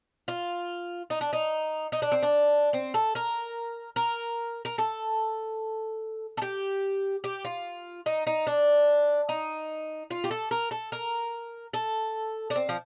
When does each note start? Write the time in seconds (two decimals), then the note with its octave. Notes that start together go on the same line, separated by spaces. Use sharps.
0.28 F4
1.10 D#4
1.21 D4
1.33 D#4
1.92 D#4
2.02 D4
2.12 C4
2.22 D4
2.73 C4
2.94 A4
3.15 A#4
3.96 A#4
4.65 A#4
4.78 A4
6.37 A4
6.42 G4
7.24 G4
7.44 F4
8.06 D#4
8.27 D#4
8.47 D4
9.29 D#4
10.10 F4
10.24 G4
10.31 A4
10.51 A#4
10.71 A4
10.92 A#4
11.73 A4
12.50 D4
12.56 C4
12.69 F3